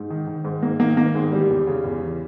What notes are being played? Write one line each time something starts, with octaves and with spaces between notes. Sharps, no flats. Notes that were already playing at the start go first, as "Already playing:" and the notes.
Already playing: G#2
D#3
D#3
G#2
G#2 A#3
D#3 A#3
D#3 A#3
G#2 G#3
E3 G3
E2
C#3
E2
E3